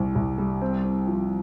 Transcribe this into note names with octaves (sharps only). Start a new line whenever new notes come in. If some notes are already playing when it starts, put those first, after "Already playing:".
Already playing: C2 C3
C2
G3
C4
C4
F3